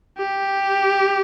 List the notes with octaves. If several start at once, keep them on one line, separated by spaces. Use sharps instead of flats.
G4